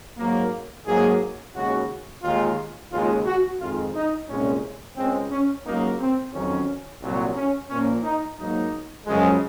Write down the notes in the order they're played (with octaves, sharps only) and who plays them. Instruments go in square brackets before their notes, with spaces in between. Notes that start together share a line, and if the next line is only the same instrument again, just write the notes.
[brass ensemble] G#2 F#3 A#3
G#2 F#3 A#3 G#4
D#2 C#3 G#3 F#4
D#2 D#3 G#3 F4
D#2 C#3 G#3 F4
F#4
F2 D#3 G#3 F4
D#4
C2 A#2 G#3 C#4
C#2 C#3 G#3 C4
C#4
C#2 C#3 F#3 A#3 D#4
C4
F2 D#3 F#3 C#4
C2 A#2 F#3
C#4
A#2 F3 A#3 C#4
D#4
G#2 F#3 A#3 D#4
F#2 C#3 F3 G#3